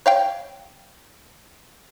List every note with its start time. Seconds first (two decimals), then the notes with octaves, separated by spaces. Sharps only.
0.06 C#5 F5 G5